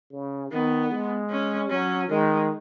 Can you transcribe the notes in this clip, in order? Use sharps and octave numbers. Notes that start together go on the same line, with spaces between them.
C#3
D#3 B3
G#3
C#4
F#3 C#4
D#3 G#3